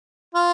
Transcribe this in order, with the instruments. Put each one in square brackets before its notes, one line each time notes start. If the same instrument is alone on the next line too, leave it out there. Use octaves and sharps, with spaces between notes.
[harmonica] F4